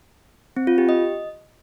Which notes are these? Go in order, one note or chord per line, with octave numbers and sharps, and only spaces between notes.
C4
F4
G4
D#5